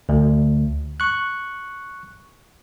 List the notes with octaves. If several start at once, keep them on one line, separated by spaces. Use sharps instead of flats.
D2
C#6 F#6